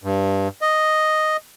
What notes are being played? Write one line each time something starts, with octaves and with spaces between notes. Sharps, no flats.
G2
D#5